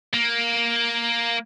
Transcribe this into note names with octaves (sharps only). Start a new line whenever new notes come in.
A#3